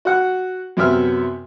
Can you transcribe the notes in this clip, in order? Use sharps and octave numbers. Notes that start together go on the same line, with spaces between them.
F#4 F#5 F#6
F#2 C3 F#3 B3 E5 F6